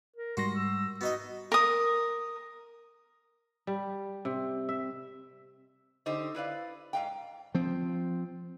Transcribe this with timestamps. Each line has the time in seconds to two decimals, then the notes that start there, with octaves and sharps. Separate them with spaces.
0.16 A#4
0.37 G#2 G3 F#4 C6 A#6
0.55 E6
1.01 B3 D#4 F#4 D#5
1.52 A#4 D#6
3.67 G3
4.25 C3
4.69 E5
6.06 D3 D#4 G4 C5
6.34 E4 B4 D5 F5
6.93 G#2 F5 G5
7.55 F3 C4